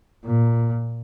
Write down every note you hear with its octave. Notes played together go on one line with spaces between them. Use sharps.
A#2